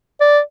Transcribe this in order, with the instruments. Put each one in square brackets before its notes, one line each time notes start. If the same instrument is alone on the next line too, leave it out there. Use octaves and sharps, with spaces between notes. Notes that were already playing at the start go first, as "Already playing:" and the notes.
[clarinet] D5